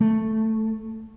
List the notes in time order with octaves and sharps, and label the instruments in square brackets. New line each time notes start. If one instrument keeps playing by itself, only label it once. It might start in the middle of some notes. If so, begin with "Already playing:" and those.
[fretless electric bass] A3